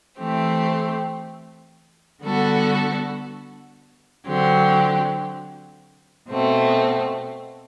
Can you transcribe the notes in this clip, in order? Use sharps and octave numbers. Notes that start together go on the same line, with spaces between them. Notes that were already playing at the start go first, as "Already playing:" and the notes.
E3 A3 C4 G4
D3 G3 B3 F#4 A4
D3 F#3 C4 G4
B2 A3 C4